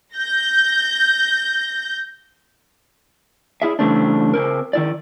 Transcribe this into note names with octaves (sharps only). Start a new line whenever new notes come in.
G6 A#6
E4 G#4 E5
C#3 E3 G3 A3 C4 D4
C#3 C4 A#4
D#3 E4 D5